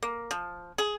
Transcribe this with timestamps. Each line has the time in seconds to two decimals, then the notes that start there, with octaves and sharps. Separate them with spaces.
0.03 A#3
0.31 F3
0.78 G#4